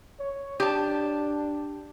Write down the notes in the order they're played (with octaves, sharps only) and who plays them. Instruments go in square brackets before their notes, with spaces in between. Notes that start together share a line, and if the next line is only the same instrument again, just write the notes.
[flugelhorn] C#5
[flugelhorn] D4 [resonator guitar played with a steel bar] G4 A5